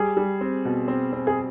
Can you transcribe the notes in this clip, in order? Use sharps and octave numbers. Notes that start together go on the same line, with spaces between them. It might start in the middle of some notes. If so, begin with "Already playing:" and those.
Already playing: G3 G#4
G3
C4
B2
C4
C4
G#4